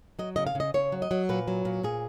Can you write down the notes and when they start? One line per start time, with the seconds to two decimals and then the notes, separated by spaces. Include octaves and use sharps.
0.19 F#3 D#5
0.36 C#3 D#5
0.47 F5
0.55 C#3
0.60 D#5
0.74 C#3 C#5
0.92 F#3
1.02 D#5
1.11 F#3
1.29 A#2 B4
1.48 F#3
1.65 A#2
1.83 A#2 G#4